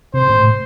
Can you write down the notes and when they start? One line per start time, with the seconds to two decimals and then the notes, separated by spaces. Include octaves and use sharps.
0.14 C3 C5
0.29 A2